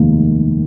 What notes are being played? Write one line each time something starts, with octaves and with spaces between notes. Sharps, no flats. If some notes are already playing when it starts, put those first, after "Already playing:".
Already playing: F1 D#2 D#3 G#3 A#3